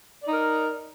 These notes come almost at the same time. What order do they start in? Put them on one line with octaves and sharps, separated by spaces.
D5 D#4 A#4